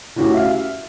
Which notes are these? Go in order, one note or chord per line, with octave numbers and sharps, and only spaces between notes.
A2 C#4 F#4 G4
E5 F5